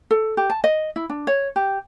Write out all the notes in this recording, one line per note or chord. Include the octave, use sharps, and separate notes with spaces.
A4
G4
A5
D#5
E4
D4
C#5
G4